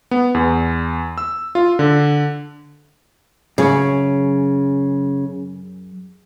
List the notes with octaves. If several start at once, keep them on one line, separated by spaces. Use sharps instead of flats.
B3
E2
E6
F4
D3
F#2 C#3 G#4 C#5